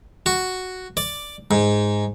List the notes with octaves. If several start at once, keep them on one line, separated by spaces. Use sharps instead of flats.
F#4
D5
G#2